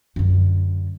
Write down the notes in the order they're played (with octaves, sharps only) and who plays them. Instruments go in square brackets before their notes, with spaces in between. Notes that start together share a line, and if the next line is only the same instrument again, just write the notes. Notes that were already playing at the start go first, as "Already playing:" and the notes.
[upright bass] F#2 D3